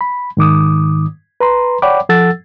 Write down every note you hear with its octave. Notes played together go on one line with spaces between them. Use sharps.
B5
G#2 D#3 D6 D#6
B4 A#5 C6
C#5 D5 F#5 G5 B5 D6
F3 A4 F#5 E6 A6